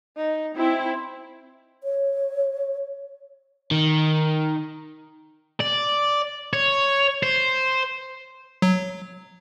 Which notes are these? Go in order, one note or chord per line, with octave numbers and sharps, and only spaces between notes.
D#4
C4 E4
C#5
D#3
D5
C#5
C5
F#3